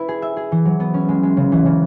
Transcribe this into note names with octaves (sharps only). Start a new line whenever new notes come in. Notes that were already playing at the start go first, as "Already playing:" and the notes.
Already playing: E4 B4
G#4
E5
G#4
E3
F#3
B3
C#4
G#3
G#3
C#3
E3
C#3